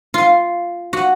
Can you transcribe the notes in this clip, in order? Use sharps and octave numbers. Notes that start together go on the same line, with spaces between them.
F4
F#4